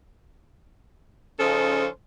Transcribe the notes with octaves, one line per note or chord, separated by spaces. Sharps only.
C#3 F3 C#4 D#4 A4 C5